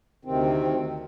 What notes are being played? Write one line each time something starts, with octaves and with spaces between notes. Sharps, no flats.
D2 C3 D#3 C4